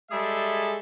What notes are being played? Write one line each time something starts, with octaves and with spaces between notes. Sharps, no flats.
G3 G#3 G#4 A4 E5